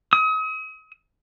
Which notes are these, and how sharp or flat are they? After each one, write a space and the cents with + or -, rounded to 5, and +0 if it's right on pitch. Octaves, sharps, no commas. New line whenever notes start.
D#6 +40